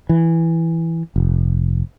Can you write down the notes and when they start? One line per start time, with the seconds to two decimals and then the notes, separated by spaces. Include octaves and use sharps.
0.09 E3
1.16 F1